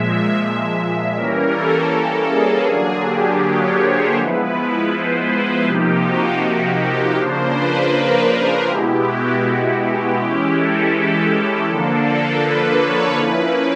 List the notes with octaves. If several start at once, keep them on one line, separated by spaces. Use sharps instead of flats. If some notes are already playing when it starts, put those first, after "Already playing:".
Already playing: A#2 F3 G#3 E5
E3 G3 A#3 C#4 A#4
A4
A4
G#4
D3 F#3 A#3 D4
G4
C#5
C5
F3 G#3 B3 E4 B4
C5
B4
C3 F3 A#3 D#4 G4
F#4
G4
C#3 F3 A#3 D4 C5
B4
A#4
B2 G#3 B3 E4 G4
F#4
G4
E3 G#3 C#4 E4
A4
D3 F3 A#3 D4
A4
B4
C#5
F3 A#3 C#4 E4 B4